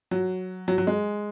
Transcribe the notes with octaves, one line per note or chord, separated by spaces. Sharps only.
F#3
F#3
F#3
G#3